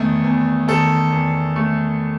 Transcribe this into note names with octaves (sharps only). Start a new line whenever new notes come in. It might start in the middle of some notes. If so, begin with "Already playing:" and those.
Already playing: E2 D#3 A3
E2
D#3 A4
E2
A3